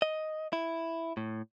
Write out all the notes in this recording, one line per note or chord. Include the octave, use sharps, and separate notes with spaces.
D#5
E4
A2